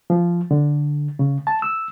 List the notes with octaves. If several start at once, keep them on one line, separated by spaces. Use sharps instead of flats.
F3
D3
C#3
A5
E6